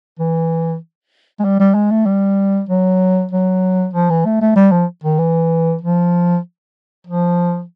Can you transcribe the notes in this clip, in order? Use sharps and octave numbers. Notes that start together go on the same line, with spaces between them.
E3
G#3
G3
G3
G#3
A3
G3
F#3
F#3
F3
E3
A3
A3
G3
F3
D#3
E3
F3
F3